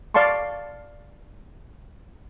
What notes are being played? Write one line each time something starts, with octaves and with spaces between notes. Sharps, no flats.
D5 F5 A5 C6 C#6